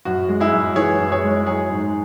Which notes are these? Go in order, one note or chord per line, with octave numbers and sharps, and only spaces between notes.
F#2 F#4
G#3
E4 G#4
F#2
E3 G#4 C#5
F#2
G#4 C#5
G#3
F#3 G#4 C#5
G#2